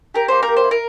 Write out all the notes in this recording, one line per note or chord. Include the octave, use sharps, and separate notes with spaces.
G4 A#4
A#3 C5
A#4
G4
C5
E4
A#4